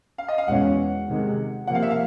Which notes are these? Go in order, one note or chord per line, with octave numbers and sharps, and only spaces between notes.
F5
D#5
F5
E2 B2 G#3 C#4 F#5
C3 D#3 G#3
C3 F3 A#3 F#5
F5
E5
F5